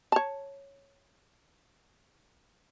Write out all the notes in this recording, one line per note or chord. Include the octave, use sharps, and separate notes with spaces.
C#5 A5